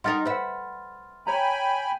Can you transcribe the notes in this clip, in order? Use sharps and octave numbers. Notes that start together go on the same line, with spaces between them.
G3 D#4 A#4 D#5 F#5 C6 F6 A6
B4 C5 E5 F#5
C#5 G5 G#5 A#5 B5